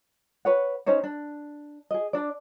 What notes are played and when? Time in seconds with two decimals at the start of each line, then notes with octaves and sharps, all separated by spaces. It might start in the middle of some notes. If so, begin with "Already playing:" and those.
0.45 B4 C#5 F#5
0.86 C#4 D#4 C5 C#5
1.04 D4
1.91 G#4 D#5
2.13 D4 D5